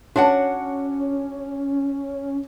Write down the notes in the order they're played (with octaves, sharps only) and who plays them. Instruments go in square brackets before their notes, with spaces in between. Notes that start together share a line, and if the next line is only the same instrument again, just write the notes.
[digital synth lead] C#4 [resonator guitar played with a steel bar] D4 F#4 F#5 [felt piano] C#5